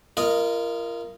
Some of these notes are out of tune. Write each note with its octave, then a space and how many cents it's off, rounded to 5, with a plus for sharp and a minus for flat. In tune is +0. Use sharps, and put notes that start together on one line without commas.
F4 -35 A#4 +0 D#5 -5